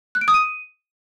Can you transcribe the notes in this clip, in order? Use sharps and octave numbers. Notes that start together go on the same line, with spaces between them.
F#6
D7
D#6
D#7